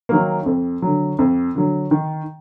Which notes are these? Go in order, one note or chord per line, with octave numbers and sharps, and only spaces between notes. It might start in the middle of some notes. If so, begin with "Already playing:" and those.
D#3 F#3 A#3
F2
D3 F#3
F2
D3 F#3
D#3